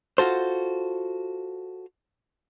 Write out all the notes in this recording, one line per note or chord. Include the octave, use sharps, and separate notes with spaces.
F4 F#4 A4 C5